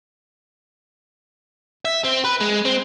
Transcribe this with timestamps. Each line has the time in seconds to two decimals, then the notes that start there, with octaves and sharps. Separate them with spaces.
1.85 E5
2.05 C4
2.25 B4
2.41 G#3
2.65 C4